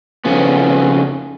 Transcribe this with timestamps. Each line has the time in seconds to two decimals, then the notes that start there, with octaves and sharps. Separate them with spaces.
0.25 F2 C#3 B3